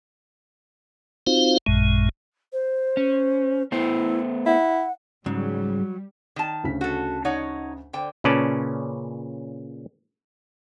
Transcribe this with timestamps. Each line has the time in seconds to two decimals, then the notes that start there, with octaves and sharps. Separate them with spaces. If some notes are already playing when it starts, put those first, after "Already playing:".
1.27 C4 D#4 F4 F#4 C5 F5
1.66 A1 F#2 A#2 G#3
2.53 C5
2.97 C#4
3.72 A3 B3 E4 C5
4.46 E4 F#5
5.26 G#2 C#3 F#3 G3
6.36 D#3 A5
6.64 D2 C#3 B6
6.81 F#4 A4
7.25 D#4 C#5 F#5
7.93 D3 C5 G5
8.24 A#2 C#3 C#4 B4 D5 A5